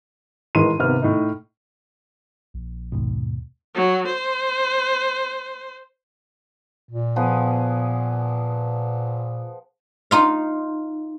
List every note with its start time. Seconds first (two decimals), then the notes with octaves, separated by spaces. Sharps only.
0.55 A1 E3 G#3 A#4 C6 D#7
0.79 G#1 C3 B3 F6
1.02 A2 D#4
2.54 A#1
2.92 D#2 G#2 B2
3.75 F#3
4.05 C5
6.89 A#2
7.16 F3 B3 G#4
10.11 D#4 F4 F5